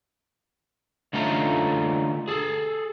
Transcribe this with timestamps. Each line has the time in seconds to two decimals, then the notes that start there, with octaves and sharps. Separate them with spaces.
1.13 D3 A3 C#4 D#4 F4 A#5
2.28 G#4 A4